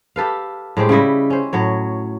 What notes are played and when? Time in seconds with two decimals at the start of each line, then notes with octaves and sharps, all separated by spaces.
0.16 G4 A4 B4 F5
0.77 A2 G#3 C4 G4
0.89 C#3 G3 E4 D#5
1.30 C#4 C5
1.53 A2 F#3 C#5